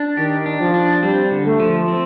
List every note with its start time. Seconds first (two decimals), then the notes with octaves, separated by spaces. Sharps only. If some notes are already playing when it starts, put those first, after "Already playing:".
Already playing: D4
0.17 D#3 G4
0.46 D4
0.60 F3
0.74 D4
1.03 G3 C4
1.31 D3
1.46 A3
1.60 F3
1.88 C4